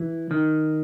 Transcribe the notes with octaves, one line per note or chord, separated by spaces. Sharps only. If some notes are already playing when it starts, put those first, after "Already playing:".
Already playing: E3
D#3